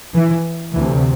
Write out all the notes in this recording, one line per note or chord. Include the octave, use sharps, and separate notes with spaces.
E3
D2 C3 E3